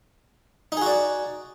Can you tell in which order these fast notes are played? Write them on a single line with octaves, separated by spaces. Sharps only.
D#4 G#4 F#4 D5